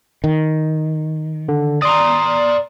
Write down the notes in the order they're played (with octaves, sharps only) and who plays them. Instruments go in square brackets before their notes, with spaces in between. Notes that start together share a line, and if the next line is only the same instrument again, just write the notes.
[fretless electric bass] D#3
[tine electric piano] D3
[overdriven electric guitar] D5 A#5 [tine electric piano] C6 D#6